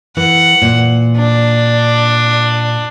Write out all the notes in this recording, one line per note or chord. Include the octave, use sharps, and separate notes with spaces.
E3 F#5
A#2
D4